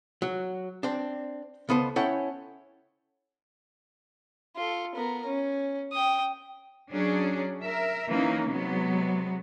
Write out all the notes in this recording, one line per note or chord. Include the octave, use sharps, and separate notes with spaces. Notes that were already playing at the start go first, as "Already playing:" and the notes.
F#3
C4 D4
C#2 B3 A4 C5
C#4 E4 A4 C#5 F#5 G5
F4 A4
B3 A#4
C#4
G5 D#6
F#3 C#4 D4 G#4
A#4 E5
E3 A#3 C#4 D#4
C3 F#3 G#3 B3